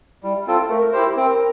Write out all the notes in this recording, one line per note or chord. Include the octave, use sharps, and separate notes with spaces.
G3 E4
C4 F4 A4
A3 A#4
E4 G4 C5
C4 A#4